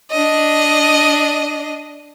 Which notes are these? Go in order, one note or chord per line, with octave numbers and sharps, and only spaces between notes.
D4 D#5